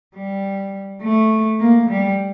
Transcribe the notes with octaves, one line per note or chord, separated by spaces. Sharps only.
G3
A3
A#3
G3